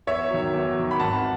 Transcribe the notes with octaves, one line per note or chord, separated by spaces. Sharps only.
E2 C#5 E5
D#3 F#3
E2
D#3 F#3
B5
G#1 F#5 A5